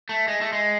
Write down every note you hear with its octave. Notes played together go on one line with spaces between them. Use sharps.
A3
G#3
A3
G#3